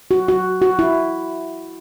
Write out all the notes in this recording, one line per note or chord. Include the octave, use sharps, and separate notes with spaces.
F#4
F#4
F#4
E4